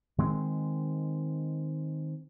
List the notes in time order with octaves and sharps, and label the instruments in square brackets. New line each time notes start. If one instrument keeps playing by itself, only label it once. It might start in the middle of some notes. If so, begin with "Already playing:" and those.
[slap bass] D#3 G#3 C4